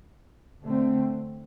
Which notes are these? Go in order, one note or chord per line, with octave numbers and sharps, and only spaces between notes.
D3 A3 C4